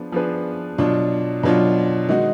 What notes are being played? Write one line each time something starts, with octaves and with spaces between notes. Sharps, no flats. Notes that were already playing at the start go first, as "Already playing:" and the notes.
Already playing: F3 B3 D4 G#4
F3 B3 D4 G#4 B4
B2 F#3 D4 F4
B2 F#3 D4 F4
D#3 G#3 D#4 F#4